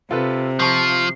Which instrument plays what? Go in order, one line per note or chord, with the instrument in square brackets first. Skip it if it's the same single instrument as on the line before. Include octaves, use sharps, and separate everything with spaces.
[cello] C3 [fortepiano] F4 A4 B4
[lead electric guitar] F3 [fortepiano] A5 C#6 F6 [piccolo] C7